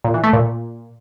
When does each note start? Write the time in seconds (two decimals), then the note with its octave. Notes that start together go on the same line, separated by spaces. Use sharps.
0.04 A#2
0.14 E3
0.24 A3
0.33 A#2